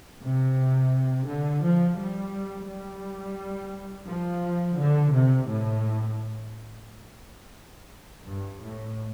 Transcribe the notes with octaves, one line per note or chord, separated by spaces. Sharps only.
C3
D3
F3
G3
G3
F3
D3
C3
A2
G2
A2